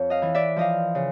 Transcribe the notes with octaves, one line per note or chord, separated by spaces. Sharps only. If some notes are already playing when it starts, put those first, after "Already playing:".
Already playing: F2 C#5
D#5 F5
E3
D5 E5
F3 D#5 F5
C#3